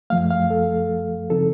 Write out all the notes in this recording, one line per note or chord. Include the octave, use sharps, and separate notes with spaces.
F#2 F3 A3 F5
F5
A4
C#3 F3 C4 D#4 A4